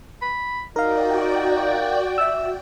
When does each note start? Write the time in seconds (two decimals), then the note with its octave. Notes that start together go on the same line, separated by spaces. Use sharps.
0.22 B5
0.76 D#4 F#4 A#4 D5 F5 G5
2.18 E5 E6